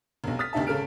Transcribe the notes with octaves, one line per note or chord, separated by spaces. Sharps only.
F1 B1
D#6 F6 A6 B6
F1 D2 C3 D#4 E5 A5
G#1 C#3 A4 A5 F6 D7